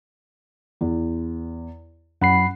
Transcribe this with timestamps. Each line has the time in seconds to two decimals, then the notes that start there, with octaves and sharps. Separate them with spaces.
0.81 E2
2.22 F#2 F#5 B5 C7